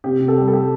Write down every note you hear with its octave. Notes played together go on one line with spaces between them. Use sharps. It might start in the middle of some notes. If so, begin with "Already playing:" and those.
C3 G4
C3
A4
G3
A4
G3 G4